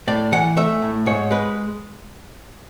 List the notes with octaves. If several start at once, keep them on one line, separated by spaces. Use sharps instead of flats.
A2 D5
E3 F#5
A3 E5
A2
G#2 C#5
G#3 B4